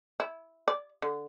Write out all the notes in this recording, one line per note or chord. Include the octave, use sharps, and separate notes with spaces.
E4
D5
D3